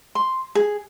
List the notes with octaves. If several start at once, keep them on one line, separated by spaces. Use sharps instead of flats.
C6
G#4